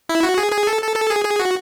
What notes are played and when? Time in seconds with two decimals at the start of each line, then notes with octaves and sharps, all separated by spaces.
0.09 E4
0.23 F#4
0.38 G#4
0.52 G#4
0.67 A4
0.82 A4
0.96 A4
1.10 G#4
1.25 G#4
1.40 F#4